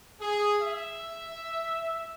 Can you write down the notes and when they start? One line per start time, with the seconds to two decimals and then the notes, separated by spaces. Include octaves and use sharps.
0.20 G#4
0.61 E5